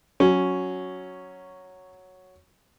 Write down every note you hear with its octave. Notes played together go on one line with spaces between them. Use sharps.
F#3 C#4